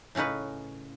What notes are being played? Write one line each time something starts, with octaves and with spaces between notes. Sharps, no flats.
A2 C#3 C#4 D#4 B4